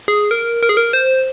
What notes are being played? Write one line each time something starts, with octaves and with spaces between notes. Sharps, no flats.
G#4
A#4
A#4
G#4
A#4
C5